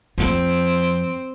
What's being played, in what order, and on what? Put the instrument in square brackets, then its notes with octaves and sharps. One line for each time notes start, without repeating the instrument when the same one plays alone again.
[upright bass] F2 F3 [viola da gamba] C4